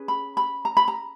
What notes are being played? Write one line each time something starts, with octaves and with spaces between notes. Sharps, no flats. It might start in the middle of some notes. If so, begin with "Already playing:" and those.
Already playing: C#4 G#4 B4
B5
B5
A#5
B5
A#5